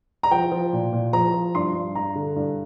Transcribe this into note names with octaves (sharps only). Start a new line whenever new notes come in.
A#5
F3 G5
F3
A#2
A#2
F3 A#5
F3
G2 C6
G2
G2 A#5
D3
G2